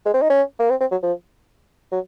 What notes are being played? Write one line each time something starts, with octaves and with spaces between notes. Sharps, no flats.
G#3
C4
D#4
C#4
A#3
C4
C4
F#3
F3
F#3